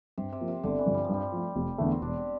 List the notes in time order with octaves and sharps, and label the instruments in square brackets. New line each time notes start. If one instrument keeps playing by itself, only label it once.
[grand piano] G2 [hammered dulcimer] C3
[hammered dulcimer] C3
[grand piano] F3 A#3
[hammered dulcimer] C3
[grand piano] G1 [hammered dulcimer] D3
[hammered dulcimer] E3
[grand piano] G2 D3 F3
[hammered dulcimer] G3
F3
[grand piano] G2 [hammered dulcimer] G3
[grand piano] F3 A3
F1
E2 D3 A3
[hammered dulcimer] C4
[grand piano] E1 [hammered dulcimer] D4
[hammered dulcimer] G4